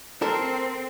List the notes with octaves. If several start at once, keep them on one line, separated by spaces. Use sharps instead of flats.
C4 A4 A#4